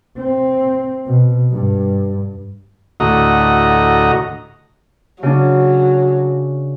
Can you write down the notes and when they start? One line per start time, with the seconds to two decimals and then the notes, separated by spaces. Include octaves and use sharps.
0.16 C4
1.06 B2
1.52 G2
3.00 D2 A2 F#4 D#5 A#5
5.23 C#3 F#3 D4